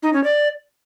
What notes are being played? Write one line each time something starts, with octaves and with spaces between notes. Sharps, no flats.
D#4
C#4
D5